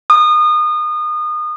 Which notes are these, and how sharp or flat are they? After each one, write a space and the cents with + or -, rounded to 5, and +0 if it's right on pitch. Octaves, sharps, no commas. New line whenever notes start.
D#6 -30